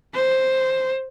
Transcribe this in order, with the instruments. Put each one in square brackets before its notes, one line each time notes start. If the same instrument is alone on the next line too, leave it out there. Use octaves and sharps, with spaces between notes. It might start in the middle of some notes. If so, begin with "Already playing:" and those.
[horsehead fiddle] C5